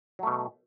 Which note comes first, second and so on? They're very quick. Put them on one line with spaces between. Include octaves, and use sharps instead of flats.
F#3 A3 B2